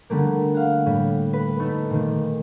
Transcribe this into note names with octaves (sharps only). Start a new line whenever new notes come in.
D3 G3 A3 A#3
F5 F#5
A2 G3
B4
A3 B3 D#4 A4
A#2 D#3